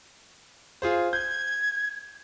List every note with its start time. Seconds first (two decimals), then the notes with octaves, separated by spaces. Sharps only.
0.82 F4 G#4 C5
1.13 G6 G#6